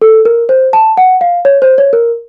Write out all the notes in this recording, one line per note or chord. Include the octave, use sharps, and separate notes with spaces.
A4
A#4
C5
A5
F#5
F5
C#5
C5
C#5
A#4